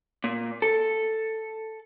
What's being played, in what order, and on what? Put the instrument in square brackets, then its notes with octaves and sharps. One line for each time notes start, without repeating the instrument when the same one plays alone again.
[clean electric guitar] A#2
A4